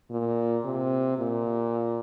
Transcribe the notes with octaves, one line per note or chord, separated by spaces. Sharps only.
A#2
C3
A#2